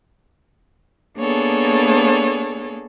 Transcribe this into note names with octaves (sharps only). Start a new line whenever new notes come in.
A#3 B3 D4 G#4 A4 C#5